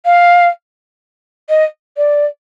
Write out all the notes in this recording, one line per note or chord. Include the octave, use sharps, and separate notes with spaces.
F5
D#5
D5